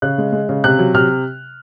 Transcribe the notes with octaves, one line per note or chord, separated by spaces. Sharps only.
C#3 F#6
G#3
G#3
C#3
C3 F#6
F#3
C3 F6